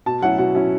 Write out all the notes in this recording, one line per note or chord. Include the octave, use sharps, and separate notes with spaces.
B2 A5
F#3 C#4 E4 F#5
B2 F#5
F#3 C#4 E4